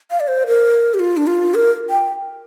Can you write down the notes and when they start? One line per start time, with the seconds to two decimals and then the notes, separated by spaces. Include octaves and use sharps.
0.11 F5
0.20 D5
0.28 C5
0.47 A#4
0.94 G4
0.99 F4
1.17 D4
1.27 F4
1.55 A#4
1.90 G5